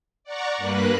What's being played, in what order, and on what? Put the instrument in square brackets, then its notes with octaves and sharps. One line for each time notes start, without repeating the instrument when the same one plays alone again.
[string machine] D5 F#5 A#5 C#6
G2 A#3 B4 F#6